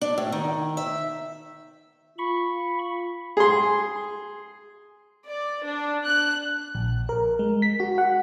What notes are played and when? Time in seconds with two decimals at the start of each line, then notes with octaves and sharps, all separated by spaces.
0.01 D4
0.18 A2
0.32 D#3
0.77 E5
2.18 F4 B5 C#6
3.37 G#4 C6
5.26 D5
5.64 D4
6.05 F#6
6.75 A#1
7.09 A#4
7.39 G#3
7.62 B6
7.80 F#4
7.98 F#5